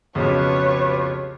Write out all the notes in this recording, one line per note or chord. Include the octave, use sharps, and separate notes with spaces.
B1 F2 C#3 F4 G4 B4 C#5